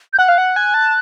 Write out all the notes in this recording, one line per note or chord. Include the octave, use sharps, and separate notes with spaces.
G6
F#5 F#6
F5
F#5
G#5
A5